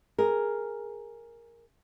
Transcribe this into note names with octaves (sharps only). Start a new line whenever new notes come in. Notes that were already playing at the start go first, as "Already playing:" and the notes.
G#4 A#4